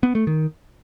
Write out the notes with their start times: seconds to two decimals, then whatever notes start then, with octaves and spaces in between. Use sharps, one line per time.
0.03 B3
0.15 A3
0.27 D#3